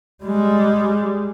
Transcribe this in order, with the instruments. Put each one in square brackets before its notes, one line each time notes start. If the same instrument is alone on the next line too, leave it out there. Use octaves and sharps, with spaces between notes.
[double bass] G3 G#3